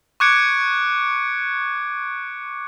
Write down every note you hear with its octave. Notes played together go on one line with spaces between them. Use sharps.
C#6 D6 F#6 G#6 C#7 D7